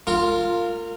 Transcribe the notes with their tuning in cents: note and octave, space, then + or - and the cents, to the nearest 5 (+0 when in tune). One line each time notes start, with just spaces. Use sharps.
F4 +0 A#4 -30 C6 +0